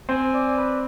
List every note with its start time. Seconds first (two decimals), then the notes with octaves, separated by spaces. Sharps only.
0.09 C4 C5 G#5
0.34 D5
0.57 B4